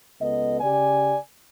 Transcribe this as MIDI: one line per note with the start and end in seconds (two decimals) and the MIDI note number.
0.21 0.60 37
0.21 0.60 59
0.21 0.60 69
0.21 0.60 75
0.61 1.16 49
0.61 1.16 67
0.61 1.16 74
0.61 1.16 80